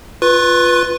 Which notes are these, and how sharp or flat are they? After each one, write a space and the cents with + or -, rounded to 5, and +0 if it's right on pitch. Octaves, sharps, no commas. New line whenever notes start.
F4 +0 B4 +0 C#6 -45